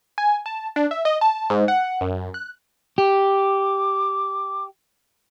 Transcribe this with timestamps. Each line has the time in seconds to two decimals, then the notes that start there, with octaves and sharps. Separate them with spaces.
0.18 G#5
0.46 A5
0.76 D4
0.91 E5
1.05 D#5
1.21 A5
1.50 G#2
1.68 F#5
2.01 F#2
2.34 F#6
2.98 G4 D6